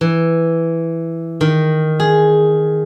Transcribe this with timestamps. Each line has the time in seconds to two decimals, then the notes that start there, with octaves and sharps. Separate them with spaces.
0.01 E3
1.41 D#3
2.00 G#4